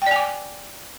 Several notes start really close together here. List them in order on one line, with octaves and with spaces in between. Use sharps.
G5 D5 G#5 D6